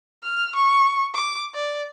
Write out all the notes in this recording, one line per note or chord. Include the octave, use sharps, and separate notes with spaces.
F6
C#6
D6
D5